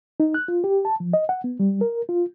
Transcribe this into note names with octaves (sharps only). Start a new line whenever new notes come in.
D#4
F#6
F4
G4
A5
F3
D#5
F#5
B3
G3
A#4
F4